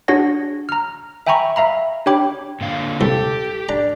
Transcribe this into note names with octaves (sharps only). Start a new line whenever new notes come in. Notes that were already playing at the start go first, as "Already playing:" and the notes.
D4 F#4 G#4 C#5 F#5 A#6
A#5 F6
E5 G5 G#5 A#5 B5 C#6
E5 F5 A#5 B5
D4 G4 C#5 G5 B5 D6
A#2 D3 F5
C2 G4 A4
D4 A#5